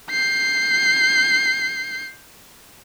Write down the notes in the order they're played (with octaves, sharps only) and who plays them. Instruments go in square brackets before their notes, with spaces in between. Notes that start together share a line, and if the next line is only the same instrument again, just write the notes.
[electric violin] G6 C7